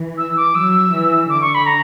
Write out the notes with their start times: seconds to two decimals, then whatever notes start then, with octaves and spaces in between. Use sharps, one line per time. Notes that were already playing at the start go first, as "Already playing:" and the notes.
Already playing: E3
0.18 E6
0.37 D6
0.55 F#3 E6
0.92 E3
1.29 D3 D6
1.41 C#6
1.55 B5
1.66 A#5